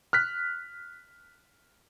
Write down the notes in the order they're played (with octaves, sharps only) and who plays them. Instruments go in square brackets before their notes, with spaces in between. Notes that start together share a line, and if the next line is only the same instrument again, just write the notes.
[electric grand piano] F6 F#6 B6